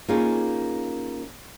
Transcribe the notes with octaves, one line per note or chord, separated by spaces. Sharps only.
A#3 C#4 D#4 F4 G#4